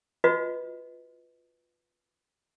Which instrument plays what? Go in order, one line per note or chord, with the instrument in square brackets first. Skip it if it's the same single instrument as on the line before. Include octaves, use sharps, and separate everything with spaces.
[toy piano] F4 F#4 B4 D#5